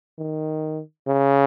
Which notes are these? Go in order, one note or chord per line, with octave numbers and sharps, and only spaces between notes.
D#3
C#3